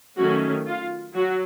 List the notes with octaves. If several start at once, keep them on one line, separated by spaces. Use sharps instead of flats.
D#3 F#3 A3 C#4 F#4
F4
F#3 F#4